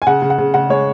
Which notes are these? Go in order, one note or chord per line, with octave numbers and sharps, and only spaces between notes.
G#5
C#3 F#5
C#3
F#5
C#3
C#3 F#5
G#3 C#5